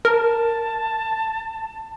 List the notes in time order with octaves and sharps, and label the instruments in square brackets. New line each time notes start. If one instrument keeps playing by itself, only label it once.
[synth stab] A#4 [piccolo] A5